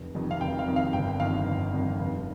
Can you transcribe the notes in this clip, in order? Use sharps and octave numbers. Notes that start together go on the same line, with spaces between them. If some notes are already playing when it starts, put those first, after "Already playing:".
Already playing: F1
F2 C3 D#3
F5
F1 G5
F5
F2 C3 D#3
F5
G1 G5
F2 D#3 F5
G1
F2 D#3
F1